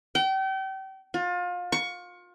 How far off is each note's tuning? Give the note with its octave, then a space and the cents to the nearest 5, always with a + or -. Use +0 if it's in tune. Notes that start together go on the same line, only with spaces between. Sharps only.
G5 -35
F4 +30
C#6 +15